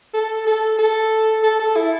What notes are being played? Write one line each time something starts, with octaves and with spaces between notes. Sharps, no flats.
A4
A4
A4
A4
A4
E4